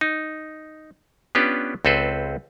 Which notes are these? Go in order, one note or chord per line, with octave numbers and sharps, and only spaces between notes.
D#4
B3 C#4 D4 F4 G4 B4
C#2 C4 A4 B4 C5